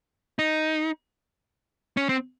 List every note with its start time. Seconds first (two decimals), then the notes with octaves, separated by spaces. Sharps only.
0.39 D#4
1.97 C#4
2.09 C4